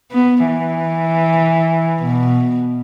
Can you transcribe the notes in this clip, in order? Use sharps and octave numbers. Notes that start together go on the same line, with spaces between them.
B3
E3
B2